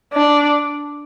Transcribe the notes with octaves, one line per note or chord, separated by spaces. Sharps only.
D4